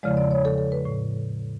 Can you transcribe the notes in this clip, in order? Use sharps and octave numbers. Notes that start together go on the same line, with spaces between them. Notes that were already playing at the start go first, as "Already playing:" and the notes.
E2 C#3 F3 G#3 D5
D5
C#5
A4
A4
B4
A2